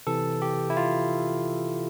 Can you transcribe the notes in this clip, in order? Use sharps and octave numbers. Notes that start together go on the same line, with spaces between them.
C3 E3 A4
G4
E4
F4